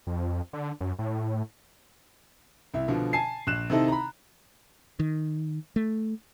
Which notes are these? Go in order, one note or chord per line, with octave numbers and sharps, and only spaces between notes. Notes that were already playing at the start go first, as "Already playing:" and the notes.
F2
D3
F#2
A2
C2 E4
B2 D3 F3
G#5 A5 C7
A#1 F#6 E7
C3 D#3 C4 D#4 E4 A4
A#5 B5
D#3
A3